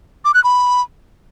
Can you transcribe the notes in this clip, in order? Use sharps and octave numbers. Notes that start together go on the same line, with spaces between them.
D6
F#6
B5